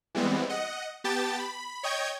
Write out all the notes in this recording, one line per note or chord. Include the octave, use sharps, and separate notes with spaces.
E3 G3 G#3 B3 C4
D#5 F#5
B3 G4 G5 A5 A6
B5
C#5 D#5 G5 G6 G#6